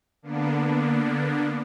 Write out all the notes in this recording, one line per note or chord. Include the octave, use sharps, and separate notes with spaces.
D3 A#3 B3 D4